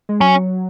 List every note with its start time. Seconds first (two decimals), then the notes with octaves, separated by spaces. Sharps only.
0.09 G#3
0.21 F#3 C#4